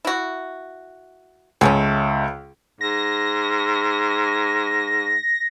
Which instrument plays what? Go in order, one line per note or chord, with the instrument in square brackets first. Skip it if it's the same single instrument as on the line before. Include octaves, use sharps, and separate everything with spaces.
[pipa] E4 F#4
[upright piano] C#2 [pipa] G#3 A3 C#4
[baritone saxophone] G#2 [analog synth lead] A#6